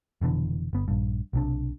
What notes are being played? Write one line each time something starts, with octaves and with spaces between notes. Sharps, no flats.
F1 B2 D3 E3
G1 B3
A#1 G2
B1 C3 D4